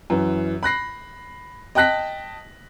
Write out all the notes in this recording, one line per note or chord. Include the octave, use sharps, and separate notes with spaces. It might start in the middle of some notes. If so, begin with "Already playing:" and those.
F#2 E3
B5 F#6 A#6 C7
D#5 G5 A5 F#6 A#6 B6